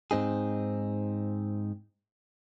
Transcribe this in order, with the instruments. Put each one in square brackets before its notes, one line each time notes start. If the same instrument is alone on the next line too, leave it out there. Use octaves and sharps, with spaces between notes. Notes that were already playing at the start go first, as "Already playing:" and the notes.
[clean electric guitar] G#2 C4 D#4 G#4